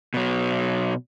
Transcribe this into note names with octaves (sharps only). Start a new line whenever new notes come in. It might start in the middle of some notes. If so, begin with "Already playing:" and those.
B2 F#3